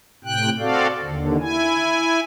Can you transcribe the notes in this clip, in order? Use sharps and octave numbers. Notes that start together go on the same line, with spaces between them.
A2 C3 G5 F#6
C4 F#4 A4 D5 F5
D#2 D3
E4 G#5